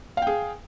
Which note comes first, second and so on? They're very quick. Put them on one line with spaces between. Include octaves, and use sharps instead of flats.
F5 G5 G#4